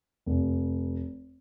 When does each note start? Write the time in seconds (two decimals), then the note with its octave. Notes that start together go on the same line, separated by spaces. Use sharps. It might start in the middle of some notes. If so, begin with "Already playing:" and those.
0.26 F1